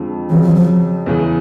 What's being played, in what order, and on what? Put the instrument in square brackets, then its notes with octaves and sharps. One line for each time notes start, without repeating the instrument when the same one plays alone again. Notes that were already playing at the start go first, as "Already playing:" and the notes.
Already playing: [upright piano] F2 D3 F3 G#3
[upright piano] F2 C#3 F#3 [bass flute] E3
[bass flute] F3
F3
[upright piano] E2 C#3 E3